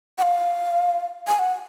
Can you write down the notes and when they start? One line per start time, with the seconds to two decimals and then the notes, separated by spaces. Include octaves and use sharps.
0.18 F#5
0.22 F5
1.28 G#5
1.39 F#5